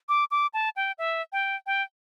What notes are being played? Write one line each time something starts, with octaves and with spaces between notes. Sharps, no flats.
D6
D6
A5
G5
E5
G5
G5